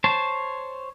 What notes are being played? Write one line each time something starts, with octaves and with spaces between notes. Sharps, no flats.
C5 C#5 A5